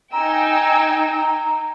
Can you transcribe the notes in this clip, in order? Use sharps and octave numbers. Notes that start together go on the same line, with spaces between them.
D#4 G5 G#5 A#5 E6